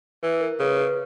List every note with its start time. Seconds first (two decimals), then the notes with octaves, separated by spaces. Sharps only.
0.23 E3 B4
0.40 A#4
0.59 C#3 B4
0.78 B4